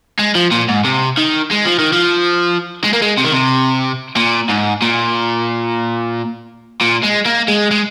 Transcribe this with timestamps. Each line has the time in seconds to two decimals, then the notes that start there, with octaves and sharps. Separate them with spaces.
0.19 G#3
0.35 F3
0.51 A#2
0.68 G#2
0.85 C3
1.18 D#3
1.51 G#3
1.65 F3
1.79 D#3
1.92 F3
2.84 G#3
2.93 A#3
3.02 G#3
3.18 C3
3.25 D#3
3.32 C3
4.16 A#2
4.49 G#2
4.82 A#2
6.81 A#2
7.03 G#3
7.26 A#3
7.48 G#3
7.71 G#3